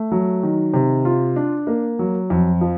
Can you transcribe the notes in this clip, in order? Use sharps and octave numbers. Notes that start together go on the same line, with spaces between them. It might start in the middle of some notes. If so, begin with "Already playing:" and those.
Already playing: A3
F#3
D#3
C3
F4
D4
A#3
F#3
F2
F3